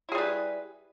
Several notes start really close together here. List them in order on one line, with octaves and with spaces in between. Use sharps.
E4 G#4 G3 B4